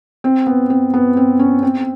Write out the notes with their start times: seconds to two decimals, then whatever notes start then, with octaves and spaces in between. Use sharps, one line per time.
0.24 C4
0.47 B3
0.70 C4
0.94 B3
1.17 C4
1.39 C#4
1.63 C4